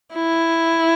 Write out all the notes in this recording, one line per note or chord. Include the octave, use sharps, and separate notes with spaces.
E4